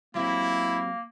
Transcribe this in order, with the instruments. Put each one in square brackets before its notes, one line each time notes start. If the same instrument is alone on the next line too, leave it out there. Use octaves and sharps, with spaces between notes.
[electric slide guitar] F#3 C4 G4 [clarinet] A#3 [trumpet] E4